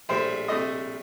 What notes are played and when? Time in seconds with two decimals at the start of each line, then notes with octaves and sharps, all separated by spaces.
0.09 A#1 A2 G3 C5
0.48 C3 A3 D#5